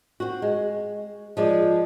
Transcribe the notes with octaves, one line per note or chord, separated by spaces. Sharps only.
C4 F#4
G#3
F3 G#3 D5